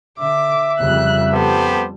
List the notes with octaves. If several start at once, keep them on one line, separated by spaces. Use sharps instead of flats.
D3 E5 D6
F2 C#3 G3 F#6
B3 G4 A4 C5